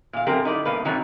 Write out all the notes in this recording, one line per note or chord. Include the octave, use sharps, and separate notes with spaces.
A#2 F5
F#2 D3 C4 G4 A#4
D#4 E4 D5
G2 B2 A#3 B4
C3 D#3 F#3 C#4 F#4 A#5